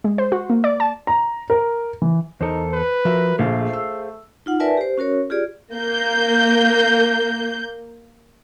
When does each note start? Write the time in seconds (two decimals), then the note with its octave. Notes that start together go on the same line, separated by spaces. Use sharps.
0.04 G#3
0.18 C5
0.32 F#4
0.50 A#3
0.64 D5
0.80 A5
1.07 A#5
1.50 A#4
2.02 E3
2.41 E2 D#4 A4 A#4 C5
2.72 B4
3.05 F3 F#4 A#4 E5
3.39 A#1 A3 G#4 C5 F5
3.73 E6
4.46 D#4 F4 F#5
4.60 A#4 B4 D5 E5 G#5 A5
4.77 G4 C5
4.98 C#4 F#4 A#4 C#5
5.30 F4 G4 G#4 D5
5.75 A#3 G6